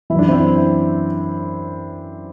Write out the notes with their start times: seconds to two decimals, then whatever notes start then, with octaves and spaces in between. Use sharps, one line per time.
0.10 E3 E4
0.15 F#2 D4
0.28 C4 E4